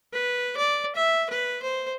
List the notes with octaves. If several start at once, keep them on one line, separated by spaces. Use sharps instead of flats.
B4
D5
E5
B4
C5